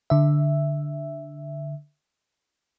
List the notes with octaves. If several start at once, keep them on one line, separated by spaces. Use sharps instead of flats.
D3 E5